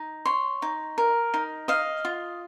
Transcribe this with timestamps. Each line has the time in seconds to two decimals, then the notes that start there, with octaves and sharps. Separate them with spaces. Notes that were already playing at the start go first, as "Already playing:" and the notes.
Already playing: D#4
0.25 C#5 C6
0.62 D#4
0.98 A#4
1.34 D#4
1.68 D#5 F5
2.05 F4